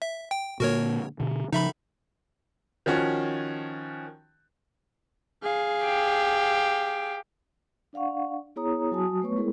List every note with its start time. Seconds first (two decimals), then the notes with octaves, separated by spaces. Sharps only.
0.02 E5
0.31 G5
0.60 A#2 D3 A#3 F#4 A#4 C#5
1.20 B2 D3
1.53 C#3 F3 D#4 E5 B5
2.86 D#3 F3 C#4 F#4
5.43 G#4 F5
5.83 G4
7.93 D4 D5 F5 F#5 C#6
8.56 B3 E4 G#4 C#5 A#5 D#6
8.91 F#3 F#4 G#5 A5 D#6
9.22 A3 B3 B4 C#5 C#6
9.36 G#3 B3 E4 G#4 A#4